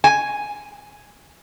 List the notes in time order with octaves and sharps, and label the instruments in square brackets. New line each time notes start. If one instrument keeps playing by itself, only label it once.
[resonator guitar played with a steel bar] G#5